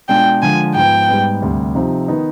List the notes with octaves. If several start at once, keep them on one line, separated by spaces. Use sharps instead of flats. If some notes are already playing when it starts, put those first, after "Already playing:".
B2 G#3 D4 F4 G5
D3 F3 G#3 G#5
G#2 F3 B3 G5
G#2 G3 B3
D2 C3 G3
C3 F3 C4 D#4
D#3 B3 D#4